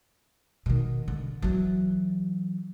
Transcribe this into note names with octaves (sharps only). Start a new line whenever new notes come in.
B2 D#3
D3
E3 F#3